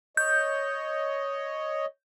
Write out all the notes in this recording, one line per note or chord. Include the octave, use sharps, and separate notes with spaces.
C#5 D#5 G6